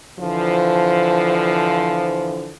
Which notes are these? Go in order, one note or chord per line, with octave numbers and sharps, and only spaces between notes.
D3 E3 F3